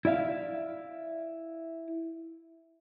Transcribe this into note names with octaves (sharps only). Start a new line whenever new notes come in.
E4 D5 E5 F5